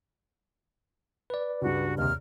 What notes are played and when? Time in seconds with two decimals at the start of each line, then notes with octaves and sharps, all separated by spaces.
1.30 B4 D5
1.62 C#2 G2 F#4
1.98 D#2 C3 F6